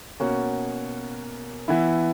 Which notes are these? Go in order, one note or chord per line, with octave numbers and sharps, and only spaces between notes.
B2 A#3 C#4 F#4
E3 B3 E4